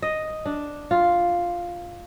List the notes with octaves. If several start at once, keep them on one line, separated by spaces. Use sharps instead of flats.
D#5
D4
F4